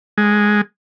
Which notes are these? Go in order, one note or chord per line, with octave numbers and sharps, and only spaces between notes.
G#3